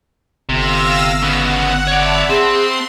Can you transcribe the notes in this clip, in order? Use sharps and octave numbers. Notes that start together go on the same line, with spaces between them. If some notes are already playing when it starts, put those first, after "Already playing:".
G1 C3 F5 E6 A#6
C#3 B3 F#5
C#5 D5 E5 A5 B5
C4 G#4 C6